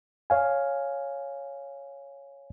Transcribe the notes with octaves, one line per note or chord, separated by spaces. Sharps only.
C#5 F5 G#5